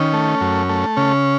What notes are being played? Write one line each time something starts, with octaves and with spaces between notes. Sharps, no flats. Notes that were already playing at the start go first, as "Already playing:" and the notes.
Already playing: D#3 C#4
A3
F#2
A3
C#3 C#4